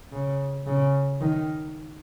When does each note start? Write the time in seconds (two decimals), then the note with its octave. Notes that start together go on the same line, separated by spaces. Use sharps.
0.13 C#3
0.67 C#3
1.21 D#3